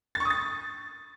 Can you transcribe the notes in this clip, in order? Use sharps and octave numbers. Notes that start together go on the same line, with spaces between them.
A6
C#6
D#6
A6